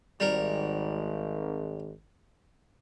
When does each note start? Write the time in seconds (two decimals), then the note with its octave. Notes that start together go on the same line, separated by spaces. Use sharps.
0.20 G#1 G3 A#4